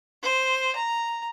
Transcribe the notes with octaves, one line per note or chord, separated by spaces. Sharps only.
C5
A#5